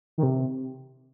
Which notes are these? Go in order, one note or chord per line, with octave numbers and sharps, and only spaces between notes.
D#3
C3